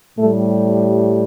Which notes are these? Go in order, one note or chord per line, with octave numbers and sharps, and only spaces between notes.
A2 G3 A3